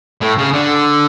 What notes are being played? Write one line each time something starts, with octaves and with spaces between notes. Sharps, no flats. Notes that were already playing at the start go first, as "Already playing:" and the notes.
A2
C#3
D3